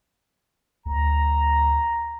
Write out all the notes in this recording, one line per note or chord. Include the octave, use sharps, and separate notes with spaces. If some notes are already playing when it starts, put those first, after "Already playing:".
D2 A#5